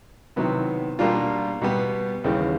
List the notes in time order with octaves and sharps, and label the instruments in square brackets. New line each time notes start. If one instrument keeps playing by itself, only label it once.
[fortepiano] C3 D#3 F#3 B3 E4
B2 G3 A#3 D4 F4
B2 G3 B3
D#2 C#3 E3 G3 B3